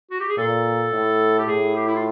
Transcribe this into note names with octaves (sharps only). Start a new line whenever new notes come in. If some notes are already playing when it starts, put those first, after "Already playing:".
F#4
G4
G#4
A#2 A4
A2
G4
A2 G#4
G4
E4
F4